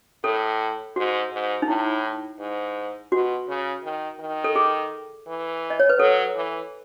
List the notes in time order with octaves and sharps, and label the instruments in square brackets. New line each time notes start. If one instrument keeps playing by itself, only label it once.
[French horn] A2 [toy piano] A4
[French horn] G#2 [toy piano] F#4
[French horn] G#2
[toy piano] D#4
[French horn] A2 [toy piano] E4
[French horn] G#2
[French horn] B2 [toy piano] F#4
[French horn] C#3
D#3
D#3
[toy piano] A4
G#4
[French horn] E3
[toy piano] D#5
C#5
B4
[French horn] F#3 [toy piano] A4
[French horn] E3